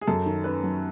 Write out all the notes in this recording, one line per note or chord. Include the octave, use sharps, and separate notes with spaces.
G#4
F#2 A4
D#3
C#4 B4
F#3